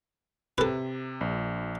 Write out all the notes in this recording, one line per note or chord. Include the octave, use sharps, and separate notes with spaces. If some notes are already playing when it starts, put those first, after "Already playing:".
C3 A4 B4
A#1